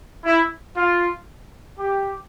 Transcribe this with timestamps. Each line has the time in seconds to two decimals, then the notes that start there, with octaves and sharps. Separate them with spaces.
0.25 E4
0.77 F4
1.79 G4